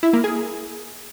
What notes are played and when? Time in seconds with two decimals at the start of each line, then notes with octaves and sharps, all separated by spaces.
0.03 E4
0.13 A#3
0.24 G#4